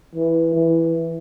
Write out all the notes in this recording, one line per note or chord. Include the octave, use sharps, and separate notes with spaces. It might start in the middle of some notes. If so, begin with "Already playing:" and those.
E3
E3